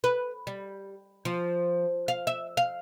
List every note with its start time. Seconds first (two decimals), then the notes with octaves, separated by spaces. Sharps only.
0.04 B4
0.47 G3
1.25 F3
2.08 F5
2.27 E5
2.57 F5